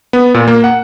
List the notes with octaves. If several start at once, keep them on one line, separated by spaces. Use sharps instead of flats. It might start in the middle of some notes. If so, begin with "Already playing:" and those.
B3
A#2
A#3
F#5